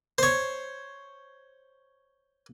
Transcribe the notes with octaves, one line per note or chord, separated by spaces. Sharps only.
C5 C#5